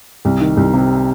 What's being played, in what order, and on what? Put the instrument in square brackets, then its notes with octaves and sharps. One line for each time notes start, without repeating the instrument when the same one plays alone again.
[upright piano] C2
D#3
C2
C3